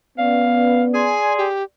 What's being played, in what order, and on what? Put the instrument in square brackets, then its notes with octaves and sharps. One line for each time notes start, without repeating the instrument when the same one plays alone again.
[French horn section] B3 [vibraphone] C#4 D5 [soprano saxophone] F5
[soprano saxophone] G#4 [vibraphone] D5 C6 [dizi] G#5
[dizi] G4